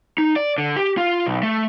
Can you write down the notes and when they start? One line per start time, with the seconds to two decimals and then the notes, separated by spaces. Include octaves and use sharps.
0.18 D#4
0.36 D5
0.58 D3
0.77 G4
0.98 F4
1.26 B1
1.43 A3